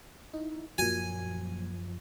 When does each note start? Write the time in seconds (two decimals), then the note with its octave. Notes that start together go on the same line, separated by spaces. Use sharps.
0.34 D#4 E4
0.78 F#2 A#2 F3 F#3 G#5